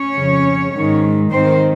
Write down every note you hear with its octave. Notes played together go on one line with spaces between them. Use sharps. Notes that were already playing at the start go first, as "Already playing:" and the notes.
Already playing: C#4 C#5
F2 C#3
G#2 D#3
G#2 D#3 C4 C5